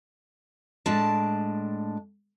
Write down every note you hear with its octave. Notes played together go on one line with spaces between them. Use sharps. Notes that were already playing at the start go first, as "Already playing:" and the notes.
A2 G#3 D4 A5